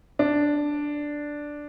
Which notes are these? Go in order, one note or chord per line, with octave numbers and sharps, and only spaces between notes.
D4